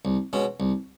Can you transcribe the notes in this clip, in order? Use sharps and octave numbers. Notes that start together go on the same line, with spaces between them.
C2
B2 G#3 C#4
C2